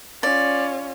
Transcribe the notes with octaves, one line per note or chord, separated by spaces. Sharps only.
C#4 F4 D5